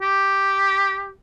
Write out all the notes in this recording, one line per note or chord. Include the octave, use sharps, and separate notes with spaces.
G4